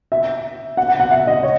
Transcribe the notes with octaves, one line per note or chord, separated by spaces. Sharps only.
E5
F#5
F#5
F#5
E5
D#5
C#5